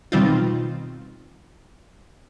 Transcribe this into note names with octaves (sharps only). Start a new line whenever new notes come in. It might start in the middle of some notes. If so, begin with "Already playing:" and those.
B2 D#3 G3 C4 D#4 F4